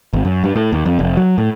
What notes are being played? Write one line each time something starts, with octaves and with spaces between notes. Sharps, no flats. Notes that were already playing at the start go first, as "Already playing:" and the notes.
G#1
F#2
G2
A2
D#2
F2
F1
F#3
A2